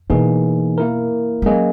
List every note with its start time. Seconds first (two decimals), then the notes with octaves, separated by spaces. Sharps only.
0.10 B2 E3 A#3 D#4 G#4
0.78 A#3 E4 A#4
1.42 G#3
1.46 F#3 A#3 C#4 G#4 D#5